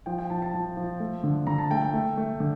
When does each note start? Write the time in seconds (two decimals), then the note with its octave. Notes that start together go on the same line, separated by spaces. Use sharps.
0.06 F3 G5
0.18 G5
0.30 F3 A5
0.42 A5
0.54 F3
0.77 F3
1.00 A3
1.24 D3
1.47 D3 A#5
1.58 A5
1.71 A3 G5
1.82 G5
1.94 A3
2.18 A3
2.40 D3